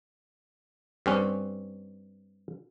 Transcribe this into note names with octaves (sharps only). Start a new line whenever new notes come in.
G2 C4 C#4